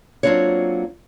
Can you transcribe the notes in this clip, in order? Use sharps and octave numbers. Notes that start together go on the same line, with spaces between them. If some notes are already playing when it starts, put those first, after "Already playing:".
F#3 A#3 C4 D4 F4 C#5